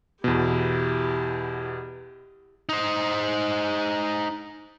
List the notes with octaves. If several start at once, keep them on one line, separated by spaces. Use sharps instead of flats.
E2 B2 E4 G4
D#4 C5